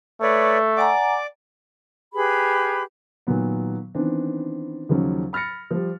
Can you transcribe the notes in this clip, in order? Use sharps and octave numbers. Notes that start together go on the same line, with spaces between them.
A3 B4 C#5 D5
D5 F#5 G#5 A#5 D6
G4 G#4 B4 B5
A#2 D#3 F#3 B3
D#3 E3 B3 C4 D4
D#2 C#3 F3 F#3 C#4
B5 F6 A6 A#6 C#7
F3 G3